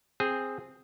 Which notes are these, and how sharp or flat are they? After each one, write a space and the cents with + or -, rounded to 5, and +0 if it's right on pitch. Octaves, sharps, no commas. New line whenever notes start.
C4 +0 G#4 -5